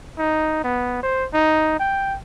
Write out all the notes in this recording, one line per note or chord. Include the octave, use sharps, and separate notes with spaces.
D#4
B3
C5
D#4
G5